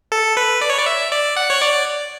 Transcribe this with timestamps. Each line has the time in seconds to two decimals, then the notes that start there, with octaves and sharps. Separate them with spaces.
0.12 A4
0.37 B4
0.61 D5
0.70 C#5
0.78 D5
0.86 E5
1.12 D5
1.37 F#5
1.50 C#5
1.62 D5